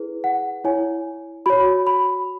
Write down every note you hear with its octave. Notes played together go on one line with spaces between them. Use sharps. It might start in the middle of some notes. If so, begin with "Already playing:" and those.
Already playing: E4 G#4 B4
F#5
E4 C#5 G#5
F#4 C#5 B5
B5